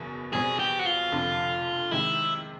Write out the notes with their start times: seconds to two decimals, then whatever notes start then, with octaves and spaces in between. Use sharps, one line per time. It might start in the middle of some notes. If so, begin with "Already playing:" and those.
Already playing: F#1 E2 B2 F#3
0.32 E2 B2 G3 C4 G#4
0.59 G4
0.79 F#4
0.86 F4
1.12 F1 F2 D3
1.91 C3 D#3 G#3 E4